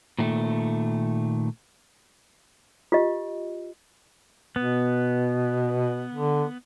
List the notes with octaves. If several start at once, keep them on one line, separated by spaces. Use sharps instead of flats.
A#2 D#3 A3
F4 G4 D#5
B2 B3
D3